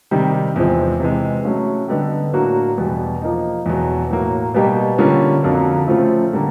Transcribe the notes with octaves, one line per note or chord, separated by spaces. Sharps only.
C3 D#3 G3
E2 C3 F3 G#3 C4
C3 E3 G#3
F#3 A3 C#4
D3 G3 B3 D#4 G4
A2 F#3 A#3 D4 F#4
E2 B2 G3 B3
F3 A#3 D#4
E2 B2 F#3
A2 F#3 A#3
B2 G3 A#3 D#4 G4
D3 G3 A#3 C#4 F4
F2 D3 F#3 A#3
C#3 F3 A3 C4 F4
D3 G3 A#3